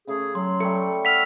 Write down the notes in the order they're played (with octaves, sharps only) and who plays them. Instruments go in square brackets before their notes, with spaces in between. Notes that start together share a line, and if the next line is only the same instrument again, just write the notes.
[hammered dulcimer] C#3 A3 [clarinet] G#4
[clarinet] F#3 [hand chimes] C6
[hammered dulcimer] G3 A3 [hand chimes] A4 C#7
[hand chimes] F#5 E6 F6 [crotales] B6 F7